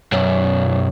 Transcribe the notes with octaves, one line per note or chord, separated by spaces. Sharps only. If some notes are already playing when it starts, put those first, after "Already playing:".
B1 F#2